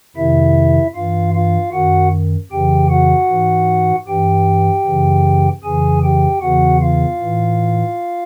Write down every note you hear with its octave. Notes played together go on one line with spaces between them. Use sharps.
F2 C3 D#3 E4 E5
G2 E3 F4 F5
F4 F5
F#2 D#3 F#4 F#5
F2 C#3 E3 G4 G5
F#4 F#5
G#2 E3
G2 E3 G4 G5
F#2 C#3 E3
F2 C#3 E3 G#4 G#5
G4 G5
E2 C#3 E3 F#4 F#5
F4 F5
A2 E3